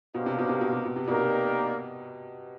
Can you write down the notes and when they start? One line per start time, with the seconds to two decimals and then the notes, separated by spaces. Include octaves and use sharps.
0.14 B2 A#3 D4 G4 C5 F5
0.26 C3
0.38 B2
0.49 C3
0.61 B2
0.72 C3
0.85 B2
0.96 C3
1.06 B2 A#3 D#4 G4 A#4 D5
1.18 C3